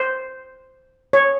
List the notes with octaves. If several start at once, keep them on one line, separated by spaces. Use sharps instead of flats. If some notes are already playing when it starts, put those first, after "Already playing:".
Already playing: C5
C#5